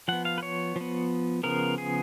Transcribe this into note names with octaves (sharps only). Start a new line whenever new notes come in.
F3 B3 F#5
F5
B4
C#5
F3 B3
C#3 F3 B3 A#4
G#4